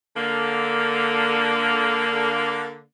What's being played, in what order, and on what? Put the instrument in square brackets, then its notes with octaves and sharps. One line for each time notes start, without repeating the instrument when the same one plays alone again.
[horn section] D3 A#3